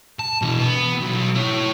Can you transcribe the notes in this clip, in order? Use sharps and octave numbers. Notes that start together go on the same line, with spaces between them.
A5
B2 E3
B3
B1
E4 C#5